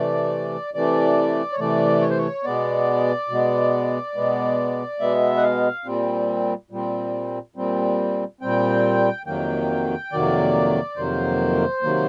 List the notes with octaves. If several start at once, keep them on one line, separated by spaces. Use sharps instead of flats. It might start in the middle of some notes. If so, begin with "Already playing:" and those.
Already playing: C3 E3 A3 D5
C3 E3 A3 D5
C#5
C3 E3 A3 D5
C#5
C5
C#5
B2 G#3 B3 D5
B2 G#3 B3
B2 G#3 B3
B2 G#3 B3 E5
F#5
F5
A#2 G3 C4
A#2 G3 C4
A#2 G3 C4
A#2 G3 C4 G5
F2 C3 D#3 F#3 A#3 G5
F2 C3 D#3 F#3 A#3 D5
F2 C3 D#3 F#3 A#3 C5
C3 D#3 F#3 A#3